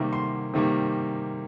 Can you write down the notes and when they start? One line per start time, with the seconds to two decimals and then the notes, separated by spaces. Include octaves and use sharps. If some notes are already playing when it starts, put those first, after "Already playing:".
Already playing: C3 D#3 G3 A#3
0.13 C6
0.54 C3 D#3 G3 A#3